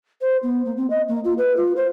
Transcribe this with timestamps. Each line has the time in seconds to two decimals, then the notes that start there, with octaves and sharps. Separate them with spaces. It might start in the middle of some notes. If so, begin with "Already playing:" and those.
0.21 C5
0.43 B3
0.65 A#3
0.77 C4
0.90 D#5
1.08 A#3
1.24 F4
1.38 B4
1.56 F4
1.76 C5